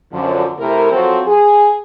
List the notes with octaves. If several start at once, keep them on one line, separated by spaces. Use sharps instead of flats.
F#2 D3 F3
C3 A3 E4 A#4
F3 F#3 C4 F#4 A4 C5
G#4